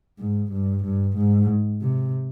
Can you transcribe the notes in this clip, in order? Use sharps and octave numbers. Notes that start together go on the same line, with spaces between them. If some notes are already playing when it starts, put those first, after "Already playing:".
G#2
G2
G2
G#2
C3